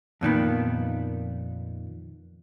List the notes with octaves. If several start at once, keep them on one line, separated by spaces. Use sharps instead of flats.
F2 A#2 D#3 B3